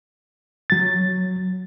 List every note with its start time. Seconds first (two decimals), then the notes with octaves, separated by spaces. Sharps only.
0.70 F#3 A6